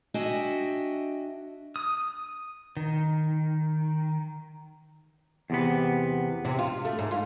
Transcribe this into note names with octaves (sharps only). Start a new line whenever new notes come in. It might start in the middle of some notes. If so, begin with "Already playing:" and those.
D4 F#4 D#5 E5 G5 G#5
D#6
D#3
E2 C3 B3
C3
F4
A3
G#2
F4